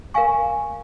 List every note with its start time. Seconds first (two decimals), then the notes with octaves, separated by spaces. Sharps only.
0.14 A#4 F5 G#5 C#6